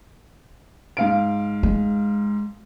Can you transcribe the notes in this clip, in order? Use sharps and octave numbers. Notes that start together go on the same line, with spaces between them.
G#2 F5 D7
G#3